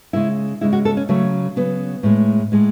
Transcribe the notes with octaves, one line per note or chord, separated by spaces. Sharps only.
C#3 G#3 E4
C#3 G#3 E4
F#4
A4
C#4
C#3 F#3 A3
C#3 F#3 B3
A2 G#3
A2 G#3